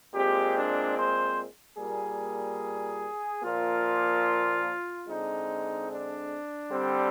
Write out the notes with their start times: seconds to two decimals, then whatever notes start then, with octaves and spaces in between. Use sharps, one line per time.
0.13 A#2 G#3 C4 G4
0.55 D4
0.96 C5
1.78 A#2 G3 A#3 G#4
3.43 A#2 F3 A#3 F4
5.07 D3 G#3 C4 D#4
5.89 D4
6.72 D3 G3 C4